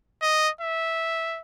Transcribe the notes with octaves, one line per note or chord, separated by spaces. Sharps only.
D#5
E5